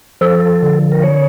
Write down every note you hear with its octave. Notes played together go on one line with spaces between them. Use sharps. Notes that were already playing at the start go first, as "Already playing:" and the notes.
F3 A4
D3
A#4
C#5